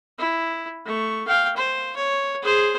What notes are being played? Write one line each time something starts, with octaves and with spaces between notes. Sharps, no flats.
E4
A3 C#6
F5 G5
C5
C#5
G#4 C5